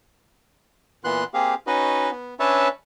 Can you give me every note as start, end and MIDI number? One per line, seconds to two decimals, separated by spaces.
1.04 1.24 46
1.04 1.24 52
1.04 1.24 59
1.04 1.24 84
1.04 1.24 90
1.34 1.55 58
1.34 1.55 60
1.34 1.55 67
1.34 1.55 68
1.34 1.55 77
1.67 2.10 61
1.67 2.10 63
1.67 2.10 66
1.67 2.10 71
1.67 2.10 75
2.11 2.34 59
2.40 2.68 61
2.40 2.68 62
2.40 2.68 71
2.40 2.68 73
2.40 2.68 76
2.40 2.68 81